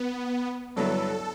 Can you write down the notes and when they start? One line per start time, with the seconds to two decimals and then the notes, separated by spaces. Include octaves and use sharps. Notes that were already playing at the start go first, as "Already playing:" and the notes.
Already playing: B3
0.76 G2 D3 F#3 B3 E4 A4